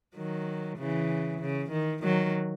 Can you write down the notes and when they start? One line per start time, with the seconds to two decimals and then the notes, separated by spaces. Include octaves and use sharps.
0.16 D#3 F#3
0.78 C#3 E3
1.41 C#3
1.72 D#3
2.03 D#3 F#3